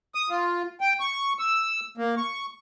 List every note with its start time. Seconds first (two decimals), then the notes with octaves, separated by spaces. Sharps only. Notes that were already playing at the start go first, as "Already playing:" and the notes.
0.15 D#6
0.30 F4
0.81 G5
1.00 C#6
1.39 E6
1.97 A#3
2.17 C#6